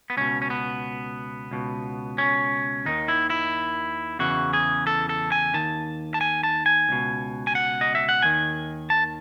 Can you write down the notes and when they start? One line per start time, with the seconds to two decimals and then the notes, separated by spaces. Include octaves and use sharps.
0.10 B3
0.17 C#2 B2 C#4
0.42 C#4
0.50 B3
1.51 C#2 B2
2.18 C#4
2.86 D#2 D#3 D#4
3.08 E4
3.30 E4
4.19 E2 C#3 E3 F#4
4.53 G#4
4.87 A4
5.09 A4
5.32 G#5
5.54 D#2 D#3 A5
6.14 A5
6.21 G#5
6.43 A5
6.66 G#5
6.89 C#2 B2
7.47 G#5
7.55 F#5
7.81 D#5
7.95 E5
8.09 F#5
8.22 D#2 D#3 G#5
8.90 A5